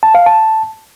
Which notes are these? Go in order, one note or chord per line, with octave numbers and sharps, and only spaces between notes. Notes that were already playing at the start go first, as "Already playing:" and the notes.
A5
F5
A5